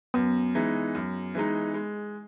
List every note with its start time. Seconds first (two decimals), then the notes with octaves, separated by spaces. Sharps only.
0.14 F#2 B3
0.55 E3 G#3 D#4
0.95 F#2
1.35 E3 G#3 D#4
1.74 G#3